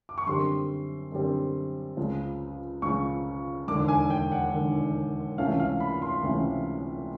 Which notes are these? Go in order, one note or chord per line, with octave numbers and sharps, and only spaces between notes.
D6
C#6
F#2 D3 G3 C4 C6
F#2 D3 G3 C4
C#2 C#3 F3
C#2 C#3 F3 C#6
E1 D#2 D3 D6
G#5
G5
F#5
E1 D#2 D3
C#2 C3 E3 A3 C#4 F5
F5
B5
C6
C#2 C3 E3 A3 C#4